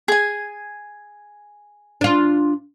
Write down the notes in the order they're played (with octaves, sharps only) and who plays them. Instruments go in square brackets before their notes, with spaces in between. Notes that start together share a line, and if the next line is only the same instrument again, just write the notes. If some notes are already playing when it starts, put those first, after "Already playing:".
[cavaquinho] G#4 G#5
[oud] D4 F4